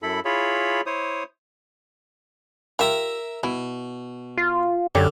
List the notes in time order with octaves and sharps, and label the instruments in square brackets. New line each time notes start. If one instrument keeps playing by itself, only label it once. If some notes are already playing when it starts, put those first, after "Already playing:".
[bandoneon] F#2 E4 A4 B5
E4 F4 G#4 C#5 B5
E4 C5 C#5 D#6
[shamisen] F4 G4 [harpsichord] A#4 E5 A#5
[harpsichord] B2 [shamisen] E4
[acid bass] F4
[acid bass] F#2 [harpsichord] D3 [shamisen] G4 C#5 D5